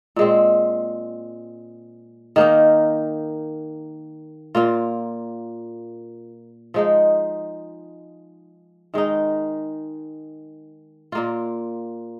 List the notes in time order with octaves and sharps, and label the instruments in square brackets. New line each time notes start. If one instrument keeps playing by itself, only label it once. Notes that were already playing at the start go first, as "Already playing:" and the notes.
[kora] A#2 G#3 C4
D#3 A#3 D#4
A#2 A#3 F4
F3 G#3 D#4
D#3 G#3 D#4
A#2 A#3 F4